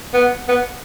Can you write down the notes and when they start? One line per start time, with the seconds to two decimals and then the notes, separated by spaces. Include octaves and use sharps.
0.14 B3
0.48 B3